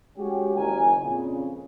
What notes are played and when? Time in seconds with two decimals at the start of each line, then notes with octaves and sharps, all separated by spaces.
0.18 G#3 C#4 F#4 G4
0.56 F#1 D#3 F#3 A#4 G#5
1.02 F2 A#2 C#3